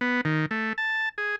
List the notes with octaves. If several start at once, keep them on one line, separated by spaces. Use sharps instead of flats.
B3
D#3
A3
A5
G#4